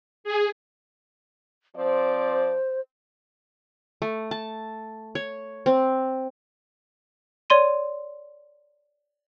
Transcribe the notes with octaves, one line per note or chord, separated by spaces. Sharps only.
G#4
F3 C4 C5 D5
A3
A5
C#5
C4
C#5 D5 C6 D#7